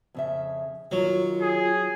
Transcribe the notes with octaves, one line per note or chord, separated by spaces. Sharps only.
F2 C#3 E5
D#3 F#3 F4 C#5
G#4